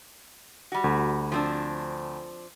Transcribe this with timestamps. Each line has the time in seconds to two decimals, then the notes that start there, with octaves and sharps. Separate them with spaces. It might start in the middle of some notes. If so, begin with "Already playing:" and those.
0.72 G3 F#4
0.84 D2
1.32 F3 C4 D4